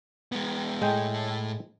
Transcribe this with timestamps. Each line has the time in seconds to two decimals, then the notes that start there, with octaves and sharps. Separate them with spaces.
0.32 G#3 B3
0.82 A2 G#3 A4 G5